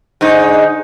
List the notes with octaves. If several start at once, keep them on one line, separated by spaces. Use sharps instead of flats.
G#2 D3 D#4